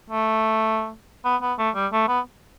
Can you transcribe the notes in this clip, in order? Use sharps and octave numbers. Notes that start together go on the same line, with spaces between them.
A3
B3
B3
A3
G3
A3
B3